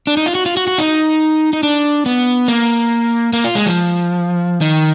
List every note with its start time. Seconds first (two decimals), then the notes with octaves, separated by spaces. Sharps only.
0.07 D4
0.17 D#4
0.26 F4
0.35 F#4
0.46 F4
0.57 F#4
0.67 F#4
0.78 D#4
1.53 D#4
1.63 D4
2.06 B3
2.48 A#3
3.33 A#3
3.44 F4
3.55 G#3
3.66 F3
4.61 D#3